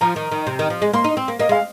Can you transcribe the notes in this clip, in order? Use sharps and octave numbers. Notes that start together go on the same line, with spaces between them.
F3 A#5
D#3
D#3
C3
D#3
F3
G#3
A#3 C6
D#4
C4
A#3
A#3 D#5
G#3 F5